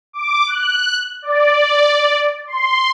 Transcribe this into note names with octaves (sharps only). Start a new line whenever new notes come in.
D6
F#6
D5
C6